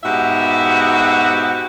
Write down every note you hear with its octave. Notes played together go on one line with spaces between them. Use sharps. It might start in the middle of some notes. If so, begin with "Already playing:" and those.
G#2 B2 F#4 G4 E5